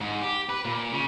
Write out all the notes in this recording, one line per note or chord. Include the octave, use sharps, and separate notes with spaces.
G#2
G4
B4
A#2
C#3